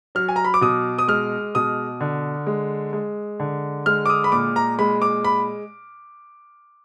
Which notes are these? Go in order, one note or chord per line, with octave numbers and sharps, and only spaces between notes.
F#3 F6
G#5
A#5
B5
D6
B2 D#6
D#6
G#3 F6
B2 D#6
D3
G#3
G#3
D3
G#3 F6
D6
D#6
B5
A#2 D6
A#5
G#3 B5
D6
B5